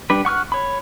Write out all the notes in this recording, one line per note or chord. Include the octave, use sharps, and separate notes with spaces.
G3 D4 B4
F#5 C#6 F6 F#6
C#5 B5